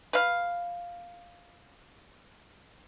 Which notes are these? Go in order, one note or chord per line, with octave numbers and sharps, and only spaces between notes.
B4 F5